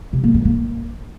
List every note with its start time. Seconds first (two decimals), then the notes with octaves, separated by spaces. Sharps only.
0.13 C3
0.24 A#3
0.34 G2
0.45 A#3